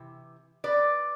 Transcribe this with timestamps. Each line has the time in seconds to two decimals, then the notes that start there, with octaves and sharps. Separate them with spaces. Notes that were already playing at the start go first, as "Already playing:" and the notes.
Already playing: C3 E3
0.64 B4 D5